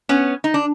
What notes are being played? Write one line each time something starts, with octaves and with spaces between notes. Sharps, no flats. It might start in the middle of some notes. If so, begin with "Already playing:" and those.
B3 C#4
D#4
D4